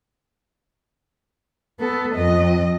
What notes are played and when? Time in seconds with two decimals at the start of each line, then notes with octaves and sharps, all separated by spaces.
1.80 B3 A4
2.14 F2 D#5